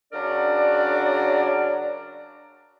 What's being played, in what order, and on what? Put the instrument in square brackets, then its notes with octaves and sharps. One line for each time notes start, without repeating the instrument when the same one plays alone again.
[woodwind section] C#3 F#3 D4 A#4 D5